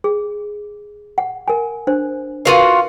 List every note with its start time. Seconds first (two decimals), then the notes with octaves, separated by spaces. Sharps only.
0.04 G#4
1.18 F#5
1.48 A#4 G#5
1.87 D4 C5
2.45 F4 F#4 A#4 B4 F5